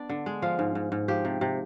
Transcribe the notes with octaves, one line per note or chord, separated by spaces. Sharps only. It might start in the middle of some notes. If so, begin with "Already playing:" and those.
Already playing: B3 D4 D5
D3
G#3
F3 F5
G#2
G#2
G#2
F3 G4
C3
C3